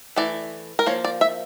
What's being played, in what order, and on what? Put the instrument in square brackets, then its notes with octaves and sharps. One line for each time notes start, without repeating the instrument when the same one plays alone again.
[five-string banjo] E3 A3 D5
A#4
F3 A#3 C#5
D5
E5